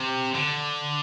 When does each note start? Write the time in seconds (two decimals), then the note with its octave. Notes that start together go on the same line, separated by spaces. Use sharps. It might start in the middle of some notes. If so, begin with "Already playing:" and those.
Already playing: C3
0.35 D3